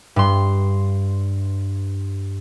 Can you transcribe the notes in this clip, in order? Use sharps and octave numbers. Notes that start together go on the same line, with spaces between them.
G2 C6